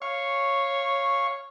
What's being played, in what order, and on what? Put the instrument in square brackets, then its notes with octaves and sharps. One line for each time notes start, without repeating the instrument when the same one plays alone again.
[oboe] C#5 [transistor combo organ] F5 C#6